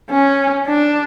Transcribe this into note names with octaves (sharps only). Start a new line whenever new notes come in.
C#4
D4